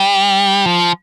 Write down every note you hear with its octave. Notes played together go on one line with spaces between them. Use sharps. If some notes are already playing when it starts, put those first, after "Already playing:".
Already playing: G3
F3